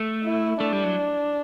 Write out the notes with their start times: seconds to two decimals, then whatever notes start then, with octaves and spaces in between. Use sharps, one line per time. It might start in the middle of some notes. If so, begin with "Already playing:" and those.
Already playing: A3
0.24 E4
0.60 A3 D4
0.73 G3
0.84 F#3